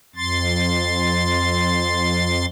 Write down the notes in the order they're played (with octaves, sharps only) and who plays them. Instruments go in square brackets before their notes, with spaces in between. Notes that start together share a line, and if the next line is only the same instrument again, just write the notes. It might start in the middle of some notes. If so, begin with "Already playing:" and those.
[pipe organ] F2 C6 A6